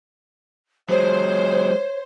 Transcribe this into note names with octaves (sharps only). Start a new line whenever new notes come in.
F#3 G#3 C5 C#5